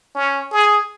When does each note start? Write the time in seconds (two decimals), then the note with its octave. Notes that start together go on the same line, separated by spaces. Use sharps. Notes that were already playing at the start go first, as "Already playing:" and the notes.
0.15 C#4
0.52 G#4